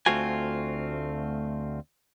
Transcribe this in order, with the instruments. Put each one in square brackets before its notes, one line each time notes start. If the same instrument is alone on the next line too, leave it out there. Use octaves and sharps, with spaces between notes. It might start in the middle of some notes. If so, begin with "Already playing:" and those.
[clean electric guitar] D2 A3 C4 F4 F#4 G#5